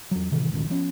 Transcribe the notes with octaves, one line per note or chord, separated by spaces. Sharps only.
E2 F#3
A2 C3 D#3 E3
G#1 C#2 A#2 D#3
F3 B3 C#4